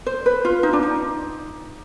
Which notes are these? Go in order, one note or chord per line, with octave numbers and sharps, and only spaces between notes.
C5
B4
F4
D#4
D4
D#4